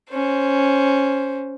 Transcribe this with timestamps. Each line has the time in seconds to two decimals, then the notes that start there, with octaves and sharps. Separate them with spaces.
0.10 C#4 C5